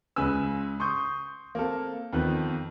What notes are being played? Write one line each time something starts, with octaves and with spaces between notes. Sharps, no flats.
C#2 C#3 B4 G#5 E6
C6 C#6 D#6 G6
A#3 C4 A4
F2 D#3 B3 B4